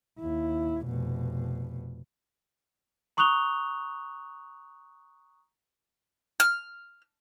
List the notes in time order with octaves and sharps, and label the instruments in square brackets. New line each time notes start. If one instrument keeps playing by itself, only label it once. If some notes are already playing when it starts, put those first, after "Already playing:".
[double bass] D#2 E4
F1 B2
[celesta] A#5 C#6 D#6 F#6 F7 G7
[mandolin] F6